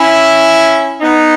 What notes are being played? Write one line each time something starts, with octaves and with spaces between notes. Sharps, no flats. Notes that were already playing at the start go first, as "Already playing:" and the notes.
Already playing: C#4 E4
B3 D#4